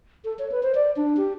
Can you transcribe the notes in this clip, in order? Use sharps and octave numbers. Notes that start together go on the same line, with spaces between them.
A4
C#5
B4
C5
D5
D4
G4